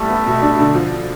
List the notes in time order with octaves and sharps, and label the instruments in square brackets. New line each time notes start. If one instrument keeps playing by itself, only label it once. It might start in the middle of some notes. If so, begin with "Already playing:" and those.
Already playing: [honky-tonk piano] C2 G3 [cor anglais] A3
[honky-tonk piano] B3
B2
D4
D3
F3